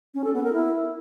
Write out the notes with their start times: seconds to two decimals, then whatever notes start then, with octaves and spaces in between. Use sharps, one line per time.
0.14 C#4
0.24 A4
0.34 B3
0.43 A#4
0.53 E4